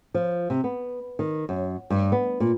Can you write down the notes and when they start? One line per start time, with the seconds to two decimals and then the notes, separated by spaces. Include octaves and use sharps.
0.14 F3
0.50 C3
0.64 B3
1.19 D#3
1.49 F#2
1.90 G2
2.12 B3
2.40 A#2